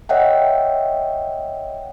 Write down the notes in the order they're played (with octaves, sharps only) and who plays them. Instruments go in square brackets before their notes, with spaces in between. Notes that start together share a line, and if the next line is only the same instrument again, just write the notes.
[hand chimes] C#5 D#5 E5 F#5 G5